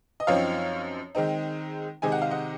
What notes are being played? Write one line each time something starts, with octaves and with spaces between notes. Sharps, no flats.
D#5
F#2 F3 C4 D#4 C#5 F5
D#3 G#3 C4 D#4
C3 D#3 G#3 D#4 G#5
F#5
F5
D#5 F#5